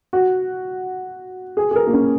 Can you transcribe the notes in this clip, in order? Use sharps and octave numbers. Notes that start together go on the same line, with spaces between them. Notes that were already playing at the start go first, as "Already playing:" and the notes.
F#4
G#4
G#4
A#4
A#3
C#4